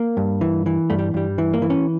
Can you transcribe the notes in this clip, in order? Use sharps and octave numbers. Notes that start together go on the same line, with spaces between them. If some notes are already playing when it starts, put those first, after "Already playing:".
Already playing: A#3
G2
E3
E3
G2 A3
G3
G2 G3
E3
A#3
E3
C#4